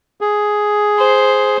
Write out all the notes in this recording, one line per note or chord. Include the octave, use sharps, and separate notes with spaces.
G#4
C5